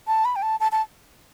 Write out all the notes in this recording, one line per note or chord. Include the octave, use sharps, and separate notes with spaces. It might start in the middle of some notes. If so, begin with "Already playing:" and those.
A5
B5
G5
A5
A5
A5